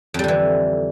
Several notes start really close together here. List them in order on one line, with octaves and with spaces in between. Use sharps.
F2 G3 D3 E3